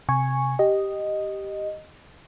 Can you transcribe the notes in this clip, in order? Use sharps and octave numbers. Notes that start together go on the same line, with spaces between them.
C3 G#5 C#6
G4 D#5